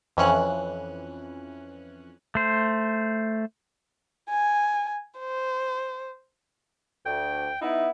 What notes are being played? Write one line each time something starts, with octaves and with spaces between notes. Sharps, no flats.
F2 E3 C#4 F#6
A3 C5
G#5
C5
D2 G5
B3 D#4 E4